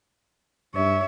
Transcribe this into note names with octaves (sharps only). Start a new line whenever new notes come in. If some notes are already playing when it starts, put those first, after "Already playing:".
G2 C#5 E5